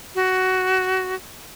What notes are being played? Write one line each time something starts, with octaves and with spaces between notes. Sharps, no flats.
F#4